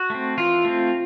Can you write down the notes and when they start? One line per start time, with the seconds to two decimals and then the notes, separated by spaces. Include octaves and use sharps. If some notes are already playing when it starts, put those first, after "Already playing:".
Already playing: F#4
0.10 A3 C4
0.38 E3 F4
0.65 A3 C4